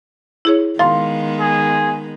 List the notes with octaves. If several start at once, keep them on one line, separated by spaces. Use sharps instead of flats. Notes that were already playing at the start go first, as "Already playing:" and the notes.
E4 G#4 C#5
D#3 G#3 B3 F5 C6 A6
G#4